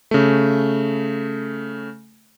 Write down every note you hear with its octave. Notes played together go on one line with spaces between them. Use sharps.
C#3 A3